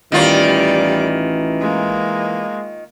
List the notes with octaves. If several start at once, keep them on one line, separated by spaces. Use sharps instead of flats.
A1 D#3 E3 G3 F4 D5
G#3 A#3